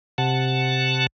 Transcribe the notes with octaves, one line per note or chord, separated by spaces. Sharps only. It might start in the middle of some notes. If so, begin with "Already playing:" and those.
C3 F#5 A5